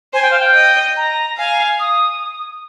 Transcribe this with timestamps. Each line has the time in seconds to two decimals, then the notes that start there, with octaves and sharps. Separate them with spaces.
0.13 C5 G#5
0.22 G5
0.30 F5
0.39 G5
0.54 D#5
0.96 A#5
1.37 F5 G#5
1.79 D#6